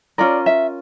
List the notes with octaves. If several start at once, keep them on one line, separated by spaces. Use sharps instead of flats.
C#4 F4 A#4 D5
E5